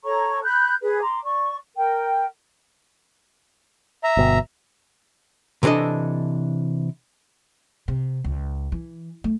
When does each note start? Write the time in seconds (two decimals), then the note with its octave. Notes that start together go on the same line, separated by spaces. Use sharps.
0.04 A4 C#5 A#5 C#6
0.43 B5 F#6 G6
0.82 G#4 B4
1.02 A#5 C6 D6
1.24 D5 C#6
1.76 A#4 G5
4.03 E5 A#5
4.17 G1 B2
5.63 C3 E3 D4 A4 D#5
7.88 C3
8.24 C#2
8.72 E3
9.24 A3